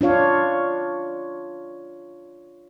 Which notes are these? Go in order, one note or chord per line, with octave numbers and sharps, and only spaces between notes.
D4 F4 C#5 F5